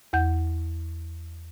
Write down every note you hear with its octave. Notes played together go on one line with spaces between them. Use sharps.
E2 F#5 G6